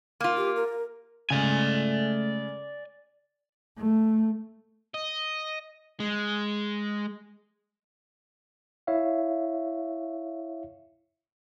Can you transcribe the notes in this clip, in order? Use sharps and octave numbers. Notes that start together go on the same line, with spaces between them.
A#3 F4
G4
A#4
C#3 G#3 A3 D5 G#5
A3
D#5
G#3
E4 C#5 E5 F5